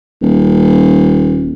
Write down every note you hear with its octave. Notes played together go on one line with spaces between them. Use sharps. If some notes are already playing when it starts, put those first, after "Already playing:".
D#1